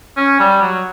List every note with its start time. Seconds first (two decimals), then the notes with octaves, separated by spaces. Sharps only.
0.17 C#4
0.40 G3
0.62 F#3